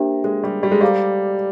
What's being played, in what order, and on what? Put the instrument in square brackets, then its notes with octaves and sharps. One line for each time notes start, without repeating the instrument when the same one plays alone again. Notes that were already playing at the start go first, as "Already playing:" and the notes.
Already playing: [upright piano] A#3 [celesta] D4 G4 C5 E5 G5
[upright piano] G#3
G3
G3
G#3
[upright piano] G3 [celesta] A4 C5 F5 A#5 D6